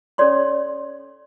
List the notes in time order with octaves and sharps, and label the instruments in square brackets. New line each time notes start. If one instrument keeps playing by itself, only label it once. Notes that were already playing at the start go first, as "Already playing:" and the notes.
[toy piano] C#4 A4 C#5 D5 C6